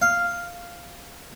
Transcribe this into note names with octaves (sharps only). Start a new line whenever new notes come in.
F5